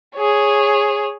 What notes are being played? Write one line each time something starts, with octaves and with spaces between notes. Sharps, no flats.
G#4 C#5